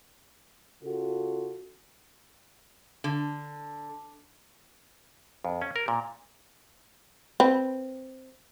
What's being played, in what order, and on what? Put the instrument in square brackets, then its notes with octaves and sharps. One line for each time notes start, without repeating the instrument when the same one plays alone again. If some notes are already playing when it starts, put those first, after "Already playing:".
[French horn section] C#3 F4 F#4 A4
[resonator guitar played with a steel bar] D3
[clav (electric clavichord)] F2
C#4
A#4
A#2
[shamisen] C4 B4